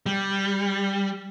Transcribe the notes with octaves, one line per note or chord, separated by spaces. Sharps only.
G3